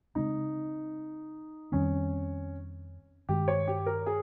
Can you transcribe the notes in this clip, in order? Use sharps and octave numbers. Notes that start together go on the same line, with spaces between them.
C#3 G#3 C4 D#4
F2 D#3 G3 C4 C#4
G2 D#3 G#3 G4
C#5
G4
A#4
G#4